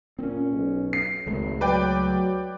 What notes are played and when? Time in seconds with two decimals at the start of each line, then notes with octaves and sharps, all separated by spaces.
0.19 A#2 C4 C#4
0.52 B1
0.93 C7
1.26 G#1 C#2 G#3 A3
1.61 F#3 B4 D5 G5